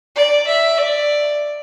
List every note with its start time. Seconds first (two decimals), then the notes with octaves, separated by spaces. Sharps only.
0.16 D5
0.47 E5
0.78 D5